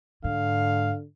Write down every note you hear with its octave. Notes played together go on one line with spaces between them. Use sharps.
G#2 D3 F5